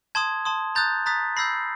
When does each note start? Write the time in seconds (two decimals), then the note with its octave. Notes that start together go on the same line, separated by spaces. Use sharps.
0.15 A5 C6 D#6 G#6
0.45 A5 C6 D#6
0.75 A#5 D#6 F#6 G6 A6
1.06 A#5 D#6 F#6 A6 B6
1.37 B5 E6 G6 A#6 C7